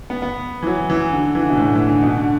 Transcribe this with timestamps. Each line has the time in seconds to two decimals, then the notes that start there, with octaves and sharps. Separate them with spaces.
0.10 B3
0.22 B3
0.62 E3
0.67 F#3
0.90 E3
1.12 D3
1.35 E3
1.42 D3
1.50 B2
1.57 A2
1.75 E3
1.89 D3
2.03 B2
2.17 D3